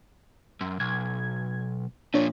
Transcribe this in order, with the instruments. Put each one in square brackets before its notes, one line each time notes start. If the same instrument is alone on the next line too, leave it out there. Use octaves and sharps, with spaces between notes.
[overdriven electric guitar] F#2
[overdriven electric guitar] B1 [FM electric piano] G#6
[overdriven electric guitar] A#2 F3 [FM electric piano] D4 C#5